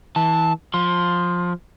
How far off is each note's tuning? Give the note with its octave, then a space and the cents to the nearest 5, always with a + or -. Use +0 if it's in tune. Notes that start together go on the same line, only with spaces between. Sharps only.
E3 -25 A5 +0
F3 +15 C6 +0